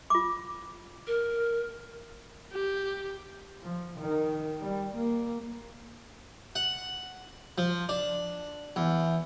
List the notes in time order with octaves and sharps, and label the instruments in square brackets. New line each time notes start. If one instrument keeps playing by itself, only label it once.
[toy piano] F4 D6
[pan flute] A#4
[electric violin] G4
[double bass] F3
D#3
G3
A#3
[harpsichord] F#5
F3
D4
E2